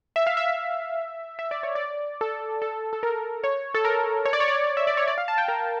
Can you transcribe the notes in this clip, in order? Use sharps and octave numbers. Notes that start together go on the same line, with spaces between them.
E5
F5
E5
E5
D5
C#5
D5
A4
A4
A4
A#4
C#5
A4
A#4
C#5
D5
C#5
D5
C#5
D5
E5
D5
C#5
D5
F5
A5
G5
A#4